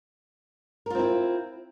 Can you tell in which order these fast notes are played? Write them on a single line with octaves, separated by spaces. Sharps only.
A#4 F4 C4 E4